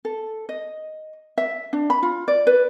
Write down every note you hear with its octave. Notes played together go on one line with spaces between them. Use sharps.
A4
D#5
E5
D4
B5
F4
D5
B4